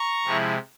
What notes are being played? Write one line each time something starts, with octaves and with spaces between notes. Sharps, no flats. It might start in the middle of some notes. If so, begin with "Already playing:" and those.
Already playing: A#5 C#6
C3 F3 G#3 E4